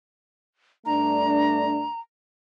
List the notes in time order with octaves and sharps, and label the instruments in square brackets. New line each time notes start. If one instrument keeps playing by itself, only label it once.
[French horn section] G2 A3 D4 [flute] A#5